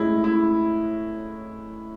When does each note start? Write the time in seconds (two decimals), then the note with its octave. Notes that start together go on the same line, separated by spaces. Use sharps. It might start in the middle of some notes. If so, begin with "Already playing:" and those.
Already playing: A2 G#3 C#4 E4
0.24 E4